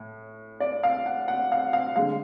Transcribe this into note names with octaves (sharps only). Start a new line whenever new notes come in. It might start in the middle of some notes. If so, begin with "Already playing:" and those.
Already playing: A2
D5
F5
F#5
F#5
F5
F5
D3 G#3 F5